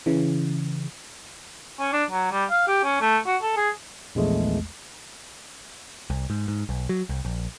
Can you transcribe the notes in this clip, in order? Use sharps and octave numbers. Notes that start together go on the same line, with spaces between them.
C#3 E3
C#4
D4
F#3
G3
F5
G4
C#4
A3
F#4
A4
G#4
A#1 E2 G#3 A3
C2
G#2
G#2
B1
F#3
C2
A#1